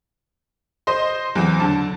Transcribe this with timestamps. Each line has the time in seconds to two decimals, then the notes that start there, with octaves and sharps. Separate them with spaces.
0.87 C5 D#5 C6
1.35 E2 F#3 C4
1.60 D3 A5